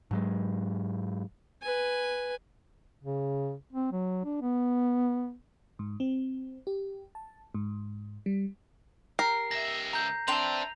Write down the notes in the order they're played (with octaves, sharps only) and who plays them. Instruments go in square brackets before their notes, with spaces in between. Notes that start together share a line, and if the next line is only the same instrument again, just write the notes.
[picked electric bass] G#2 F#3 G#3
[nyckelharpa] B4 G#5
[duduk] C#3
C4
F#3
D4
B3
[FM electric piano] G#2
C4
G4
A5
G#2
G3
[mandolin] G4 [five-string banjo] A#4 [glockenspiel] C7
[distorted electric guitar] C#2 E5 [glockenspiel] A#6
[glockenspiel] A#5 G6
[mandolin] C4 D4 G5 [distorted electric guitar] B4 E5 [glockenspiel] F7